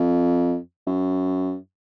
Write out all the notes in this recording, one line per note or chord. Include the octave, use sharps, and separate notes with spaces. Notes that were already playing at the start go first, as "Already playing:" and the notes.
Already playing: F2
F#2